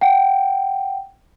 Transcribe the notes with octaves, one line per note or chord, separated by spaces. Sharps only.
F#5 G5